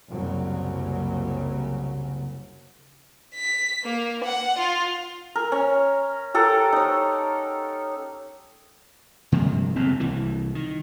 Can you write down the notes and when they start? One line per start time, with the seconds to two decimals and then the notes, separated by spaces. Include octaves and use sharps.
0.10 F#1 C2 C#3 F#3
3.35 B6
3.84 A#3
4.24 F#5
4.58 F4
5.35 A#4
5.52 C#4
6.34 G4 A4 A#4 F#5
6.72 D#4 C#5
9.32 G2 C3 F3 F#3
9.76 F#1 E2 G#2 C4
10.00 C2 E3
10.55 D#3